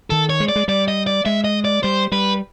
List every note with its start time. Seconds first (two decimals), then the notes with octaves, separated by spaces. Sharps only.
0.10 D#3 A4
0.30 C#5
0.40 G#3
0.49 D5
0.56 G#3
0.68 G3 D5
0.88 D#5
1.07 D5
1.25 G#3 E5
1.44 D#5
1.65 D5
1.83 G3 C5
2.12 G3 B4